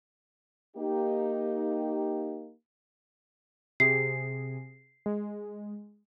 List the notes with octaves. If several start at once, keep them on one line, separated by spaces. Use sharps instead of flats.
A#3 D#4 G4
C3 G#4 C7
G#3